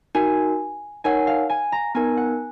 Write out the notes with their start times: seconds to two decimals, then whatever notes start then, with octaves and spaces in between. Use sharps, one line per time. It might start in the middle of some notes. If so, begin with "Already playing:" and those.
0.15 D#4 F#4 A#4 G#5
1.04 D#4 A#4 C#5 F#5 G#5
1.27 F5
1.50 G#5
1.72 A#5
1.95 B3 D#4 A#4 G#5
2.17 F#5